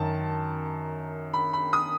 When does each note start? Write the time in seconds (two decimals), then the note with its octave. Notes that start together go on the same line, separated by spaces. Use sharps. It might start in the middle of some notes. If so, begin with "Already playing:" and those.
Already playing: F#2 D#3 A5
1.33 B5
1.53 B5
1.73 D#6